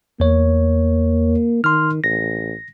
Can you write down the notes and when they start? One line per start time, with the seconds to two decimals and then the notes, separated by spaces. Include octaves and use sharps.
0.20 E2 A#3 C#5
1.64 D#3 C6 F6
2.04 A1 A#6